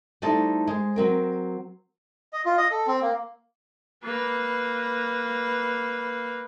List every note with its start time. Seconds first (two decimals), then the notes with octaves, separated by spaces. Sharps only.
0.22 G3 A3 D#4 E4 C5 A5
0.67 G#3 C5
0.96 F#3 C4 A#4
2.33 D#5
2.45 F4
2.57 D#5
2.71 A4
2.87 C4
3.02 A#3
4.04 A#3 B4